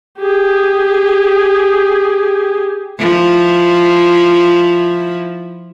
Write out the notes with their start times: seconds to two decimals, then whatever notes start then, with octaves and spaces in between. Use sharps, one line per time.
0.19 G4 G#4
2.99 F3 E4